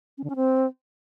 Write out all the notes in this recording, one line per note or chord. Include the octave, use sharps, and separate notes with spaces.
C#4
D3
C#4
C4